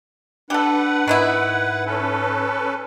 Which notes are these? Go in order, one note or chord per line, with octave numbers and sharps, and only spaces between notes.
D4 G4 A4 B4 F#5
G#2 D#3 B3 E4
C#4 A4 B4